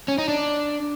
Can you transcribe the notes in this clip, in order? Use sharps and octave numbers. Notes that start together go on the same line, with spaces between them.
C#4
D#4
D4